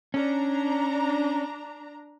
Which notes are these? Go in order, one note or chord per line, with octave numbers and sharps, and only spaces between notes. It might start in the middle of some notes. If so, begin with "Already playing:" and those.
C#4 D4 A#5